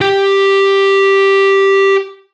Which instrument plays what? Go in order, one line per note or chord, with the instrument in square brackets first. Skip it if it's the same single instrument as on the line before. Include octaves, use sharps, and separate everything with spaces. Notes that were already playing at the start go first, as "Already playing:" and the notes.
[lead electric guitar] G4 G5